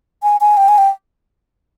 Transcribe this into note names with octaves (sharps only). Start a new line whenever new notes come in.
G#5
G#5
G5
G#5
G5